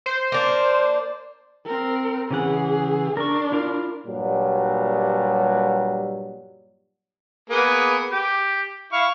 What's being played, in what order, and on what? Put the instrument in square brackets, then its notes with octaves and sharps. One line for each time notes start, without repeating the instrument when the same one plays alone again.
[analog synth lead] C5
[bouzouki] A#3 D4
[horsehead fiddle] C4 A#4
[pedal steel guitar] C#3 E3 F#5 [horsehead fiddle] G#4
[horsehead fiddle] D4 [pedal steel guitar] A#4 C#6
[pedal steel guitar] E4 F4 A#4
[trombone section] G2 A#2 F#3 G3
[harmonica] A#3 B3 G#4
G4
E4 F5 C#6